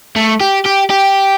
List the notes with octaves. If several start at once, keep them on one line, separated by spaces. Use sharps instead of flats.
A3
G4
G4
G4